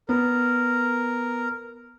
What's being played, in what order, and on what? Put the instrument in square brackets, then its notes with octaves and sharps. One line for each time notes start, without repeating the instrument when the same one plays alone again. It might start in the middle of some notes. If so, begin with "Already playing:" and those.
[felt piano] B3 [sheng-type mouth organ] A#4